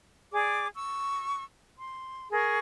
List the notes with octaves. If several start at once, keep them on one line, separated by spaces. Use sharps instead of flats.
G#4 D5 D6
C#6 E6
C6
G#4 A#4 C#6